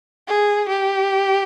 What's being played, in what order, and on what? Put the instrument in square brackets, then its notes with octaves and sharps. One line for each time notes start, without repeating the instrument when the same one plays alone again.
[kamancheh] G#4
G4